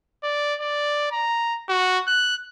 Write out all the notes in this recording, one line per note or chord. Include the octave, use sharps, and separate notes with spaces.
D5
D5
A#5
F#4
F#6